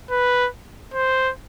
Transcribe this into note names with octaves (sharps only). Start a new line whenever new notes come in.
B4
C5